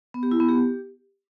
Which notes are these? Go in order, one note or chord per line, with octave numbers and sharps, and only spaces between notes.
B3
G4
E4
B3
G4